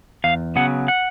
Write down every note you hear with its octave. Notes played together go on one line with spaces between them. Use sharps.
E2 F5
C#3 F#3 B3 F#5
F#5